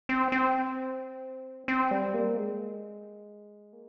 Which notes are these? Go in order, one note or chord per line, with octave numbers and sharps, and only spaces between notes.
C4
C4
C4
G3
A#3
G#3
A#3